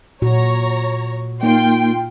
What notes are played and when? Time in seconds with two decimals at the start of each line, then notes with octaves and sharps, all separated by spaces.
0.22 A#2 F#4 C#5 A#5
1.43 A#3 D#4 F4 G5 C6